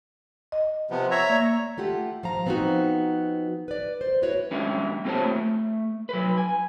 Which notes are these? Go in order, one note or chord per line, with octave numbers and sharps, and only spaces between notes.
D#5
C3 F3 B3
C#5 E5 A#5
A#3 D5
A3 F4 G4 F#5
F3 F5 A#5
F3 B3 C4 D4 D#4 F#4
B4 D5
C5
E4 F#4 B4 C#5
G3 G#3 C#4 D4 E5
C4 F4 G4 C5 C#5 A5
A3
F#3 B4
G#5